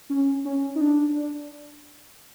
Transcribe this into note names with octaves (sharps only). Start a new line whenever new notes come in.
C#4
C#4
D#4
D4